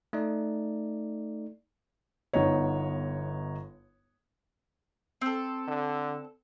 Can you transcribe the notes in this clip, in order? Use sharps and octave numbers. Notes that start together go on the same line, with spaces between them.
A3 D#4 D5
G1 B3 D#4 C#5
C4 A4
D3